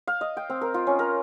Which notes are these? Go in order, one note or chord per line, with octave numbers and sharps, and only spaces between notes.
F5
D#5
G5
C4
A#4
F4
C#4
A#4